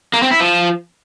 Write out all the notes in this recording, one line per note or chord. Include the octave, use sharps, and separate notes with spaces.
A#3
C4
E4
F3